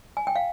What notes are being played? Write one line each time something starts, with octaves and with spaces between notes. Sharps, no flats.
G#5
G5
F5